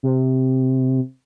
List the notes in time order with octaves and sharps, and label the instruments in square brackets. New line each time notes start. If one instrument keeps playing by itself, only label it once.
[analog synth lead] C3